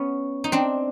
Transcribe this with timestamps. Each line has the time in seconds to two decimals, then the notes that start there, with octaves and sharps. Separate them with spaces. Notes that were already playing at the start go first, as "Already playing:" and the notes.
Already playing: B3 C#4
0.44 D#4
0.52 C4 D4